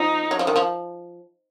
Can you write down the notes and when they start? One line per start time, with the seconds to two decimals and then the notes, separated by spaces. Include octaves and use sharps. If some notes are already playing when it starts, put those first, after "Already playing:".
Already playing: F3 D#4
0.31 F#3
0.39 F3
0.47 D#3
0.56 F3